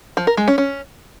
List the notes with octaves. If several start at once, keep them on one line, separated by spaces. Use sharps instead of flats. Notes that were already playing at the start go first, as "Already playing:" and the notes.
F3
A#4
G#3
C#4
C#4